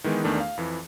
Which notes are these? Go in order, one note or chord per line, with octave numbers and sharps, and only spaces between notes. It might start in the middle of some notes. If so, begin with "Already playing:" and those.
D#3 E3 G#3 B3 D#4
E2 D#3 A3 D4
F5
F2 E3